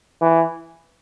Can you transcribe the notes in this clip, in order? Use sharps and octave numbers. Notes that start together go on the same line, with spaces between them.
E3